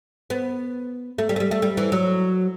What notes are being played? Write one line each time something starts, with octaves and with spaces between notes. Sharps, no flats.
B3
A3
G3
A3
G3
A3
G3
E3
F#3